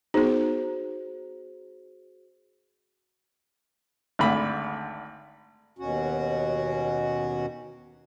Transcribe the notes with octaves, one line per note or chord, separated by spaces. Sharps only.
B3 D#4 F#4 G#4 C5
G#1 D2 D3 B5
D#2 B2 C#4 F#4